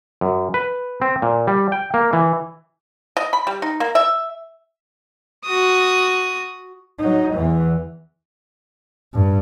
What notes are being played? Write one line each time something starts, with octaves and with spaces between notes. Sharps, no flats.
F#2
B4
C4
A#2
G3
G5
A#3
E3
D#5
B5
G3
D#4
A#3
E5
F#4 D#6
F#3 D#4
E2 E3
G2